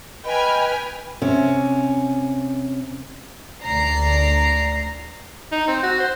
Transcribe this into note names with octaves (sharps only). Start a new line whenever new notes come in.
B4 D#5 G5 G#5 B5 F6
C3 C#4
D2 D5 A#5 C7
D#4
C4
F#4
C5